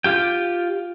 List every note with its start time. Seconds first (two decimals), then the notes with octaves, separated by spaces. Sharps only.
0.04 F4 G4 G5